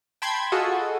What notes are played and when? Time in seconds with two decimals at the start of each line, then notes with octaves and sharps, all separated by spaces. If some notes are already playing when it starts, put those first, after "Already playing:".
0.22 G5 A5 B5 C6 G#6
0.52 F4 F#4 G#4 A4 D#5